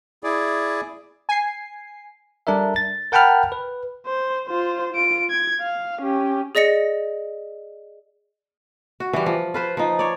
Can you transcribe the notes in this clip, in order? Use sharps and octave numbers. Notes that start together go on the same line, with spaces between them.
E4 G#4 D5
G#5 C7
G3 D4 A4 A#4 E5
A6
A#4 F#5 G5 A5 B5 F6
B4
C5
F4 C5
F4 D7
G#6
F5
C#4 G4
G#4 D5 D#5 A#6 C#7
F#4
E3 G3
F3
F4 B4 C5
F3 D#4
C#5 D5